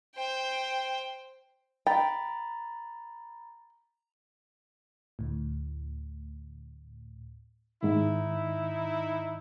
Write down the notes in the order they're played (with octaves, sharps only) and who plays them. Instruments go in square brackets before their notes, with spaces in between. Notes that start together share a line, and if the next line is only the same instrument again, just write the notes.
[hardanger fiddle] C5 G5
[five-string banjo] G5 [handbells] A#5 B5 A6
[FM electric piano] D2 A2
[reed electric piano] G#2 D#3 [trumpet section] D#4 E4